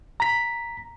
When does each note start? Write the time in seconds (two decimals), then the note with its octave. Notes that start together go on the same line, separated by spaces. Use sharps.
0.20 A#5 B6